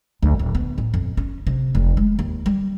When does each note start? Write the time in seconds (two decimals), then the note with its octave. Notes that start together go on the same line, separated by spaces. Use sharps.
0.22 D2
0.39 D1
0.55 B3
0.78 A2
0.94 F2
1.17 C#4
1.47 C3
1.75 F1
1.97 G#3
2.19 D#2
2.46 G3